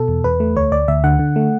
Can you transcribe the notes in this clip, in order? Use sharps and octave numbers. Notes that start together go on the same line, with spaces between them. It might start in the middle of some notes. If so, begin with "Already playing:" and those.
Already playing: B2 A4
E2
E2 B4
A3
D2 C#5
D2 D5
D2 E5
D3 F#5
D3
A3